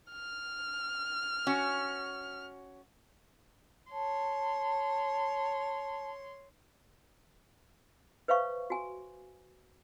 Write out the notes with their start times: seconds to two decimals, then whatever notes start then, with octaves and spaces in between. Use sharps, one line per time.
0.12 F6
1.47 C#4 F#4
3.92 C#5 A5 C6
8.28 B4 C5 E5 F5 C#6
8.70 F#4 G#5